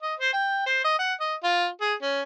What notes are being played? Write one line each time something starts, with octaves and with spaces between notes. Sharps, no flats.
D#5
C5
G5
C5
D#5
F#5
D#5
F4
G#4
C#4